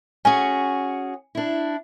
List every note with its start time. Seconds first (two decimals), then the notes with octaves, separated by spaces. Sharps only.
0.25 C#4 F#4 G#4 G#5
1.35 D4 E4